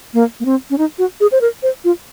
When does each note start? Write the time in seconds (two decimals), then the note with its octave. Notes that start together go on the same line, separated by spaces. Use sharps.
0.14 A#3
0.40 A#3
0.45 C4
0.70 C#4
0.78 D#4
0.98 F#4
1.20 G#4
1.32 C5
1.41 A#4
1.63 C5
1.84 F4